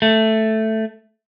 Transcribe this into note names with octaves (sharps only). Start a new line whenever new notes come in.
A3